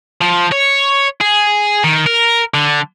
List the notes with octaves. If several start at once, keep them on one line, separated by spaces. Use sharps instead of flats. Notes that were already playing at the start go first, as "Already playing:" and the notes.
F3
C#5
G#4
D#3
A#4
D3